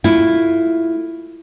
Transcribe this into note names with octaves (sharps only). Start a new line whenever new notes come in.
A3 E4 F4